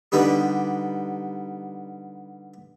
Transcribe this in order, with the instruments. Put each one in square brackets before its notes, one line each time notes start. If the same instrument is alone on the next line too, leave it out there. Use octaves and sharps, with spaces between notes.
[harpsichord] D3 G3 B3 D#4 G4